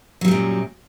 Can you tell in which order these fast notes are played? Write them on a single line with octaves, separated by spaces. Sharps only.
F#3 G3 A#2 F#2